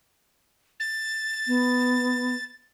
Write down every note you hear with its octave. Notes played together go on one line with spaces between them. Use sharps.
A6
B3